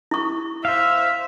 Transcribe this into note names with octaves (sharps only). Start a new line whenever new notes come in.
E4 C#6
C5 E5 F5